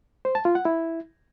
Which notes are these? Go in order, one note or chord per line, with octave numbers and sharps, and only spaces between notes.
C5
A5
F4
F#5
E4